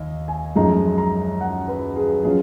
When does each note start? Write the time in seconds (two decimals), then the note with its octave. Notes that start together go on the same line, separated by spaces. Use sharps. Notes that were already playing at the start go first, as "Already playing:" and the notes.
Already playing: D#2 D#5
0.28 G#5
0.56 F#2 F3 G#3 D#4 A#5
0.98 A#5
1.41 F#5
1.68 B4
1.96 G#4
2.23 F#3 C#4 F4 G#4